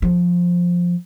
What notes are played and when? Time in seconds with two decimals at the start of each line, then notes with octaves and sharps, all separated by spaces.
0.02 F3